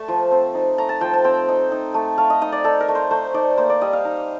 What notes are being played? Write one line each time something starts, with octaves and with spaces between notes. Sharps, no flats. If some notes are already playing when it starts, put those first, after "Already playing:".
Already playing: A3 A5
F3
C4
D#4
A3 A#5
A5
F3 G5
A5
C4 G5
D#4
D#4
A3
A3 F5
D#5
D#4 D#5
D5
D#4 A4
A#4
A3
C5
A3 C5
D#4 D5
A#3 C5
D5
G3 D#5
F5
D#4